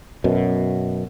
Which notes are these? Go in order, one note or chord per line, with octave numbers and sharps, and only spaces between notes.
F#2 B2